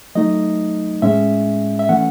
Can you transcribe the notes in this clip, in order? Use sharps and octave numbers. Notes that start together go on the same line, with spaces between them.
F#3 A3 D#4 D#5
A2 G#3 C#4 E5
E5
E3 A3 C#4 F#5